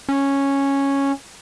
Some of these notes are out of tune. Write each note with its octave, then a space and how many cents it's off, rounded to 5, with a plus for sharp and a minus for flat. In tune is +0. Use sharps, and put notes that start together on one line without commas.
C#4 -5